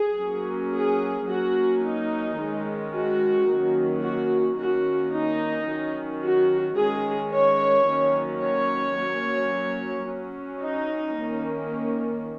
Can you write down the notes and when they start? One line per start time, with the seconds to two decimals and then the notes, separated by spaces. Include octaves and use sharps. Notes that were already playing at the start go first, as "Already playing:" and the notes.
Already playing: G#4
0.18 F#3 A#3 C#4
0.73 G#4
1.27 F#3 A#3 C#4 F#4
1.82 D#4
2.37 D#3 G#3 C#4
2.92 F#4
3.47 D#3 F#3 A#3 C#4
4.02 F#4
4.57 D#3 A#3 C#4 F#4
5.12 D#4
5.67 D#3 F#3 C#4
6.22 F#4
6.76 D#3 G#3 C#4 G#4
7.32 C#5
7.86 D#3 F#3 A#3 C#4
8.42 C#5
8.96 F#3 A#3 C#4
10.06 F#3 C#4
10.60 D#4
11.16 D#3 A#3 C#4